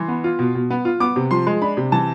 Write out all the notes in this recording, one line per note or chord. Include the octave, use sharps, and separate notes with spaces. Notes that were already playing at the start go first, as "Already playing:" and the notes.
Already playing: E3 C6
B3
F4
B2
B2
B3
F4
B3 D6
C3
F3 C6
G#3
D4 B5
C3
E3 A5